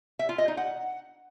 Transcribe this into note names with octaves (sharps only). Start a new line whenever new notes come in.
E5
F4
D#5
D#4
F#5